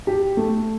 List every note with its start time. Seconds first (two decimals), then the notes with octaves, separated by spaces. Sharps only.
0.07 G4
0.37 A3